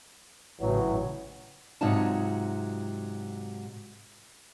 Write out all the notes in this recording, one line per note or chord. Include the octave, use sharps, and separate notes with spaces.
A1 A2 C#3 E3 F#3
G#2 C3 F#3 D#4 F4 A5